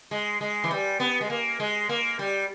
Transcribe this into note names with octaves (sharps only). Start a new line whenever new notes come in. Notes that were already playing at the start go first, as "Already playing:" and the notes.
G#3
G#3
E3
G3
B3
G#3
A#3
G#3
A#3
G3